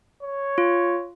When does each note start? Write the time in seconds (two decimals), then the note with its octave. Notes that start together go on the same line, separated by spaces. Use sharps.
0.23 C#5
0.58 F4